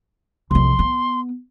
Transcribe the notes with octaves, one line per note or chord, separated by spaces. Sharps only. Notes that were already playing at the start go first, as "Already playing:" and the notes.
C2 F2 C6
B3